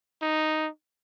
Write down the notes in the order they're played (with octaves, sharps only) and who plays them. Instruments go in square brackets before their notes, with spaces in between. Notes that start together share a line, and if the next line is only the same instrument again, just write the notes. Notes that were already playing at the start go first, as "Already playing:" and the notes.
[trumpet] D#4